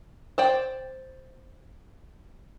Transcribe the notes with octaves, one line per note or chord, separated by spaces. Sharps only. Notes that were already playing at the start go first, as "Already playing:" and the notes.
C5 D5 G5